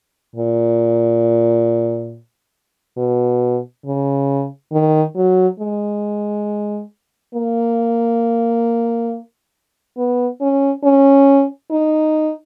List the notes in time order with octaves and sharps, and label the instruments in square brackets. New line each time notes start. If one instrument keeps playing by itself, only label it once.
[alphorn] A#2
B2
C#3
D#3
F#3
G#3
A#3
B3
C#4
C#4
D#4